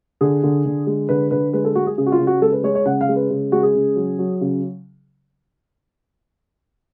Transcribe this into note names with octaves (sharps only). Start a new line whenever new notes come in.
D3 G#4
D3
D3
G#3
D3 B4
D3 B4
G#3 B4
A4
G#3 F#4
G#4
C#3 G#4
F#4
F4
C#3
F#4
G#3 A4
B4
G#3 C#5
C#5
C#3 F#5
F5
G#3
B4
C#3
G#3 F#4
G#4
C#3
F#3
F#3
C#3